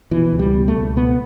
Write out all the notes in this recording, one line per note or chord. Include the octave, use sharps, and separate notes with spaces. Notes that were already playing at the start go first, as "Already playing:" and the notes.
B2 E3
C#2
G3
B2
A3
C#2
B2 B3